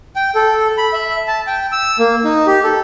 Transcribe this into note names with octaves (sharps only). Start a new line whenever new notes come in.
G5
A4
B5
E5
A5
G5
E6
A#3
D#4
G4
A4